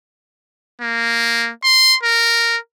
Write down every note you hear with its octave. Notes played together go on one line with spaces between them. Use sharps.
A#3
C6
A#4